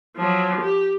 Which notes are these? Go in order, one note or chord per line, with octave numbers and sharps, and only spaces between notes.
F3 F#3
G4